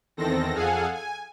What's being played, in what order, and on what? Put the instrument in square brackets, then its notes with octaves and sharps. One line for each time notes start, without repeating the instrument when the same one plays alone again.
[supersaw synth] E2 D#3 C4 A4 A#6
F2 G#4 A4 F5 F#5 G#5
G#5